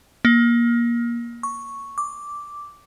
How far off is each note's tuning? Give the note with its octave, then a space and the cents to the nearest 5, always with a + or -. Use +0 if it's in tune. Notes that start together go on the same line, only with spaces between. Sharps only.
A#3 +20
C#6 +0
D6 -5